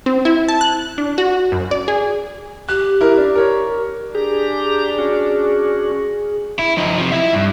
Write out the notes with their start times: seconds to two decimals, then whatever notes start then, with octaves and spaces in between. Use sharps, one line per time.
0.06 C4
0.25 E4
0.48 A5
0.61 F#6
0.98 D4
1.18 F#4
1.52 F#2
1.71 D5
1.88 G#4
2.69 G4 F#6
3.01 E4 A#4
3.17 D4
3.36 A#4 C#5
4.15 D4 G4 G#4 A#5
4.98 C#4 F#4
6.59 E4
6.77 F3 D#4
6.98 C3 F3
7.12 E4 E5
7.33 G2